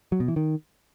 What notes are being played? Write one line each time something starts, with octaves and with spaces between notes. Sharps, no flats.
F#3
B2
E3
D#3